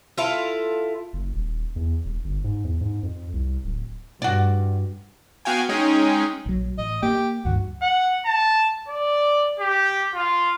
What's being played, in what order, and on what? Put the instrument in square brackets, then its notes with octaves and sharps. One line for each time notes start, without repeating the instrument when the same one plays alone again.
[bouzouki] E4 F4 A4
[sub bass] F#1
D#1
E2
D#1
G1
G#2
E2
G#2
F2
C2
D1
[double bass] G2 [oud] F#4 D5
[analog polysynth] B3 F#4 F5 G5 G#5
G#3 C#4 D#4 G#4 G5
[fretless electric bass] A#1 F#3
[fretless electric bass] A1 [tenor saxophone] D#5
[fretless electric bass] A#3 [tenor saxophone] G4
[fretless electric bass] C#2 G2 D#3 [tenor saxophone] F#4
[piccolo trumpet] F#5
A5
D5
G4
F4